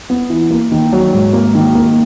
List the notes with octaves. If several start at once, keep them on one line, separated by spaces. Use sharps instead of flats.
B3
E3
A#3
D#3
F#3
G#2
A#3
D#3
A#3